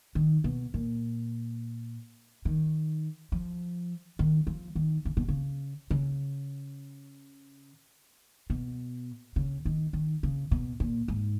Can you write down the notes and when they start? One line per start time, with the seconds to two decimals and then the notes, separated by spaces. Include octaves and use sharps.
0.15 D#3
0.44 B2
0.74 A#2
2.45 D#3
3.32 F3
4.19 D#3
4.47 F3
4.75 D#3
5.05 C#3
5.17 B2
5.28 C#3
5.91 C#3
8.50 B2
9.36 C#3
9.65 D#3
9.93 D#3
10.23 C#3
10.51 B2
10.80 A#2
11.08 G#2